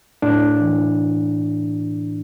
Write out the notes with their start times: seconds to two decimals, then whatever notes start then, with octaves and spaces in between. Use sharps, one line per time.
0.22 A2 D4
0.61 E3